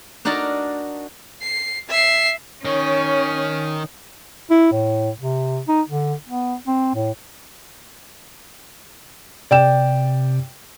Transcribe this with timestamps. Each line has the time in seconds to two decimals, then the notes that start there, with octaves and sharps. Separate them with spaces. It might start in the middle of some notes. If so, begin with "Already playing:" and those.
0.25 D4 D#4 F#4 A#4 D5 A5
1.41 C7
1.89 E5 C7
2.65 D#3 C#4 C#5
4.50 E4
4.72 A2
5.20 C3
5.68 D#4
5.88 D3
6.29 B3
6.67 C4
6.95 A2
9.51 C3 D5 G5 E7